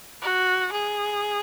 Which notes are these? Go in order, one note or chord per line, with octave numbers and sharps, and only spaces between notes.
F#4
G#4